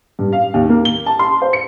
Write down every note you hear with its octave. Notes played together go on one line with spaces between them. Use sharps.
G2
F5
D#2
A#3
G7
A5
C6
C5
C#7